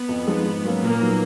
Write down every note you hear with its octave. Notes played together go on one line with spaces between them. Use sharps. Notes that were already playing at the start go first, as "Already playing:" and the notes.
Already playing: B3
F2
F3 G#3 D#4 G#4
G#2
F#3 A#3 C#4
A#2 A#3
F#3 B3 D#4